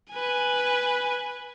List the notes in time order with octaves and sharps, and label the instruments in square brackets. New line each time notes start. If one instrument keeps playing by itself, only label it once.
[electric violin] B4 G#5